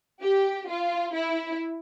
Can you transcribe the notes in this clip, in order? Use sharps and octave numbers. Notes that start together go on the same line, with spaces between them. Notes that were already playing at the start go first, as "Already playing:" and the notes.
G4
F4
E4